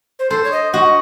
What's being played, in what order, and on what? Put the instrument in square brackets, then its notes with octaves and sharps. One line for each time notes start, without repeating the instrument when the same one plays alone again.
[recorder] C5
[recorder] A4 [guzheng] C5
[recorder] C#5
D#5
[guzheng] F#4 [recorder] D#5